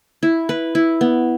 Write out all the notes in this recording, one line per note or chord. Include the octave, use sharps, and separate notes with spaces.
E4
B4
E4
B3